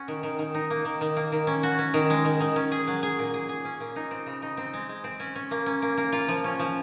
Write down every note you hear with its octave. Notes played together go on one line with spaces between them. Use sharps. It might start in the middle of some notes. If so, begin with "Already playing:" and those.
Already playing: C#4 F#4
D#3
D#3
D#3
D#4
A#3
D#3
D#3
A#3
D#3
C#4
F#4
C#4
D#3
G#3
D#3
D#3
C#4
G#4
F#3
G#4
A#2
G#4
G#4
C#4
A#2
D#4
C4
C#3
D#4
C4
G#3
G#3
C4
C#4
C#4
A#3
C#4
A#3
A#3
F4
F3
C#4
F3